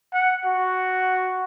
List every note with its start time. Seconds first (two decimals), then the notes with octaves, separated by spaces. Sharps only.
0.13 F#5
0.45 F#4